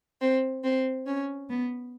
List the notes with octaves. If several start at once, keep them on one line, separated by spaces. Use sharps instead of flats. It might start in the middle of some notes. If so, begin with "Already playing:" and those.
C4
C4
C#4
B3